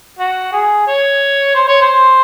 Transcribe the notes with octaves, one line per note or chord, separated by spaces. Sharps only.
F#4
G#4
C#5
C5
C#5
C5